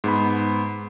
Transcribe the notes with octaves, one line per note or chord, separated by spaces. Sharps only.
G#2 B3 B5